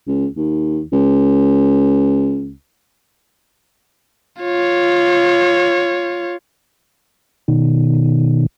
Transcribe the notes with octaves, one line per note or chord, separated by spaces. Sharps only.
C#2
D#2
C#2
F4 C#5
B2 D#3